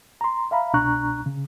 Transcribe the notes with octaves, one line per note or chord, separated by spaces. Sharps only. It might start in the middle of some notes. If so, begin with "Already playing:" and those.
A#5 C6
E5 F5 A#5 B5
C2 B2 D4 A#5 C#6 F#6
C#3